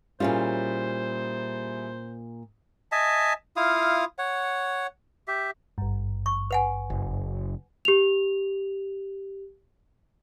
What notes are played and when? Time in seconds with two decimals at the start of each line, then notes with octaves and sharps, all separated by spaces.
0.20 A#2 G3 C#4 E4 F4 G#4 C5
2.92 D#5 E5 G#5 A5
3.56 E4 F4 F5 D#6
4.19 C#5 F#5
5.28 G4 E5
5.78 G#1 G2
6.26 C#6
6.51 B4 F#5 G#5
6.90 F#1
7.85 G4 F7